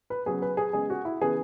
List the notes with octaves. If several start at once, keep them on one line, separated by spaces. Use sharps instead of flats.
B4
C#3 F#3 B3 G#4
B4
G#4
C#3 G#3 B3 G#4
F#4
E4
C#3 E3 B3 G#4